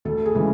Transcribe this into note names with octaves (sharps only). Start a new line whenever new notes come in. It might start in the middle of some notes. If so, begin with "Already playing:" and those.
D2 A4
G#4
C#3 E3 G#3 C#4